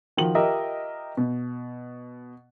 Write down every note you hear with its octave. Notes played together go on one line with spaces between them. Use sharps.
D#3 F3 F#4 F#7
F4 G4 A#4 D#5 E5
B2